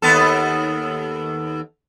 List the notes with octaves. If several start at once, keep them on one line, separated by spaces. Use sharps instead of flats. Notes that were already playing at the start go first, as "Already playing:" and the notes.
D#2 B3 A4